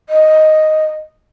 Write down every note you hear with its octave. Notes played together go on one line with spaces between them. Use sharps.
D#5